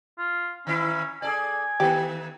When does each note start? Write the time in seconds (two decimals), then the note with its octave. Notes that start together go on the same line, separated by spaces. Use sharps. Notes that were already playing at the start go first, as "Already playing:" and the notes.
0.18 F4
0.67 D#3 C#4 E4
1.22 G#4 A4 D5 G#5
1.80 D#3 A3 B3 G4